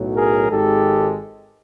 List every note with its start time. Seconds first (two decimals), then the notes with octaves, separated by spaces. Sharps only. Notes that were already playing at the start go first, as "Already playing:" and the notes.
Already playing: B1 A2 F#3
0.16 G#4 A#4
0.50 G#1 G#2 D#3 G#3 G4 A4